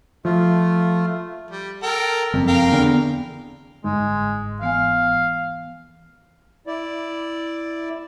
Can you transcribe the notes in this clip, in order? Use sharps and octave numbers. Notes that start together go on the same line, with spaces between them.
F3 A3 F4
G3
A4 A#4 G5
F#1 F2
A#4 F5 G5
E2 D3
G1 G#2 G#3
E3 B3 F5 G#5
E4 D5